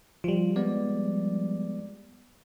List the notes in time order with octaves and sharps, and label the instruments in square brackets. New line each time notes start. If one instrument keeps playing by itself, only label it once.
[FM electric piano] F3 G3 [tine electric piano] F4
[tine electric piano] G#3 B3 D5